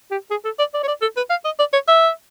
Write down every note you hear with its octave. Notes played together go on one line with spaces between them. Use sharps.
G4
G#4
A4
D5
D5
C#5
D5
A4
B4
F5
D#5
D5
C#5
E5